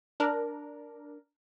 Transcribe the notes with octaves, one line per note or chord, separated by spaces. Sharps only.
D4 A#4